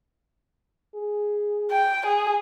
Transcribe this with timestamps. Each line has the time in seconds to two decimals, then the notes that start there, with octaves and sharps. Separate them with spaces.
0.95 G#4
1.71 G5
2.07 G#4